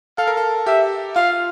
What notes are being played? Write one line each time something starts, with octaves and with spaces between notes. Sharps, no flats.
A4 F5
A#4
A4
G4 E5
F4 F5